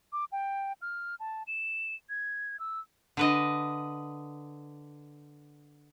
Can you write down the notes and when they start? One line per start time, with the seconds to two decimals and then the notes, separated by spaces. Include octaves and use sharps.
0.13 D6
0.32 G5
0.82 F6
1.20 A5
1.47 E7
2.10 G#6
2.60 E6
3.17 D3 B4 D#5